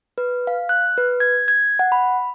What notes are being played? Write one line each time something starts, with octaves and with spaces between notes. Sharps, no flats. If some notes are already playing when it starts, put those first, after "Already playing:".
B4
F5
F#6
B4
G#6
G#6
F#5
B5